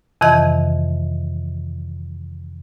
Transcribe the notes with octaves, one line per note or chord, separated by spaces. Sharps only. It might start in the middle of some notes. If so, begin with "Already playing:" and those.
F2 C3 D#3 E3 D#5 G#6